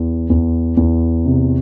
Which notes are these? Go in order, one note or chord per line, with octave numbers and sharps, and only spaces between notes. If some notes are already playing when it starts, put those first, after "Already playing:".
Already playing: E2
E2
E2
C3